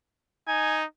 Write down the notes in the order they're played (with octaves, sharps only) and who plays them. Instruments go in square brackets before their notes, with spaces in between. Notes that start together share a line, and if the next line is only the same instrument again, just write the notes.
[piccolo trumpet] D#4 [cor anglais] G#5